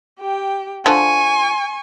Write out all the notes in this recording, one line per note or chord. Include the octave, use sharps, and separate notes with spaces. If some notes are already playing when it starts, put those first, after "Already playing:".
G4 G5
D3 F3 G#5 C#6